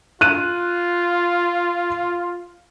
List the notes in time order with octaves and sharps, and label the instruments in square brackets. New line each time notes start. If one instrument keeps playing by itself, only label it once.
[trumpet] F4 [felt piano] F#6 D#7